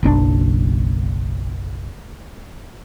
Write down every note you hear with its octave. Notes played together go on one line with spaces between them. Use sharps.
F#1 B1 C#4 D4